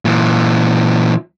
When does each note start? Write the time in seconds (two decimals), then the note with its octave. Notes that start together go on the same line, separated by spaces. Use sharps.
0.05 A#2 E3